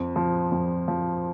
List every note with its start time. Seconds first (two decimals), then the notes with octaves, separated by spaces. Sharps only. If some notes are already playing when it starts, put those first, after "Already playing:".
Already playing: F2
0.16 F3
0.52 F2
0.88 F3